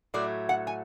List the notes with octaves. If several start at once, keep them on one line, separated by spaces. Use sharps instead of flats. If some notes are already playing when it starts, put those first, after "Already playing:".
A2 F#3 A3 D5
F#5
G#5